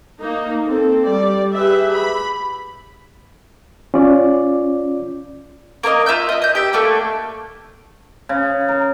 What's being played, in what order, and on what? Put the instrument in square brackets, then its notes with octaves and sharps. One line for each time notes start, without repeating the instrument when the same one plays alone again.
[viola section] A#3 D#4
C4 A4
G3 D5
G4 G#4 B4 E5
B5
[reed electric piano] C#4 F4 D5
[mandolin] A#3 A#4 C#5 D#5
F4 E5 E6 G6
D#5 F#6
D#5 G6
G4 E5
A3 A#3 D4 G5
[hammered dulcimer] C#3
A#4